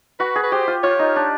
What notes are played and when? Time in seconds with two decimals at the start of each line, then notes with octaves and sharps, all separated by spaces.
0.20 F#4 B4
0.36 G#4
0.44 B4
0.52 G4 C5
0.68 F4
0.83 F4 C#5
0.99 D#4
1.16 D4